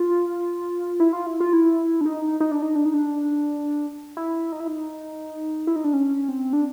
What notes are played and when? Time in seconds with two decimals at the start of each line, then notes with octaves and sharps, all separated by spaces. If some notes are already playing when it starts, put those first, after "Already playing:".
Already playing: F4
1.00 E4
1.13 F4
1.26 E4
1.40 F4
1.53 E4
2.01 D4
2.06 D#4
2.40 D#4
2.51 D4
2.62 D#4
2.75 D4
2.85 D#4
2.94 D4
4.17 E4
4.52 D#4
4.60 E4
4.68 D#4
5.67 E4
5.76 D#4
5.84 D4
5.93 C#4
6.29 C4
6.53 D4